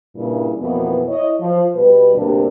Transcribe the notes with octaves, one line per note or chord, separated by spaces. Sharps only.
G2 A#2 C#3 G3 E4
F2 B2 E3 A#3 B3
E4 C#5 D#5
F3
B2 G3 B4
D2 G2 C3 A#3 D4